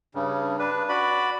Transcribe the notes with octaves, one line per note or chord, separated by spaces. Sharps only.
G2 C#3
D4 B4
F#4 D5 B5